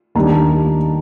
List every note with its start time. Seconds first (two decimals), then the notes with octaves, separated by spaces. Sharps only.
0.15 D#2 D#3 G3 D4 A#5
0.31 A5